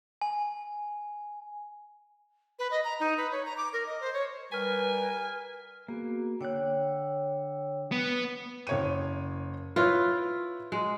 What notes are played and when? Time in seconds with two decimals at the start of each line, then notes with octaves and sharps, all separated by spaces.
0.22 G#5
2.59 B4
2.71 D#5
2.84 A#5
3.00 D#4
3.17 B4
3.32 C#5
3.45 A#5
3.57 D6
3.73 A#4
3.86 D#5
4.01 C5
4.13 C#5
4.52 G3 A#4 B4 G#5 F6 B6
5.88 A#3 B3 F#4 G#4
6.41 D3 C#5 G5 F#6
7.92 B3
8.67 F#1 C#5 D#7
9.76 E4 F4 B4 C#5
10.72 G#3